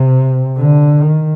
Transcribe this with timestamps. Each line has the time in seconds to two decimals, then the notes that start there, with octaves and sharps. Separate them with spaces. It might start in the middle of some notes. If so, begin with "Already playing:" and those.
Already playing: C3
0.58 D3
1.01 D#3